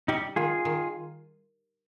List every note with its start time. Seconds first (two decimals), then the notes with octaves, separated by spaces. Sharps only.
0.08 G3 D#4 G4
0.36 D#3 F4 G#4
0.65 D#3